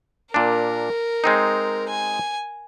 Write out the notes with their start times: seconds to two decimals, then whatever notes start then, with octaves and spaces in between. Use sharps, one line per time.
0.34 A#2 D4 A#4
1.24 G#3 C4 D#4
1.89 G#5